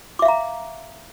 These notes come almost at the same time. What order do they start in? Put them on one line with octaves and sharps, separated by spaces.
D6 E5 F5 A#5